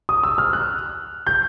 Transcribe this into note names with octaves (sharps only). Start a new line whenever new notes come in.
D#6
E6
F6
F#6
G6